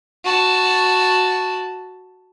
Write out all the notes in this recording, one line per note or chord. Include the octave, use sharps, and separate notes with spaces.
F#4 A5